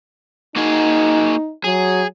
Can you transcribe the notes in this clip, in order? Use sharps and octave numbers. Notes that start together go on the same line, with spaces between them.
A#3 D#4 F#4 G#4
F#3 G#4